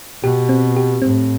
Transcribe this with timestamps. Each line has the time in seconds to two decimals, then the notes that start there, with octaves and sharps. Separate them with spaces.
0.23 B2 G4
0.49 C4
0.77 G4
1.02 A2 C4